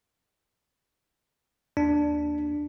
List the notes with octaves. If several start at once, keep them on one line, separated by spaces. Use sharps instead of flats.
D#2 D4